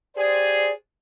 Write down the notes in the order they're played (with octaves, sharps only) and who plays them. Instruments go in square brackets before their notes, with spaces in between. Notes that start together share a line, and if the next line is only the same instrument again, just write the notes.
[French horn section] G4 G#4 C5 [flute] D5